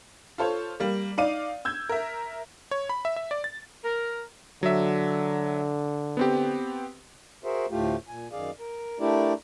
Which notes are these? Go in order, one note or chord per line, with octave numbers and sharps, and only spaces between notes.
F4 A4 C5 C#5
G3 A#3
D#4 D5 F5 D#7
E6 G6 G#6
A#4 E5
C#5
B5
E5
E5
D5
A6
A#4
D3 F#3 E5
B3 C4 G4
F#4 G#4 A#4 C5 E5
D2 A2 A3 F4 G4
A#2 G#5
F#2 D#3 G#4 D5 F5
A#4
A3 D4 E4 G4 A#4 D5